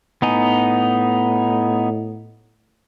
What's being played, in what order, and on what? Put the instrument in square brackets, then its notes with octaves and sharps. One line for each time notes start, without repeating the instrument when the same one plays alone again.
[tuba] A2 [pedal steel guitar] B3 D#4 G#5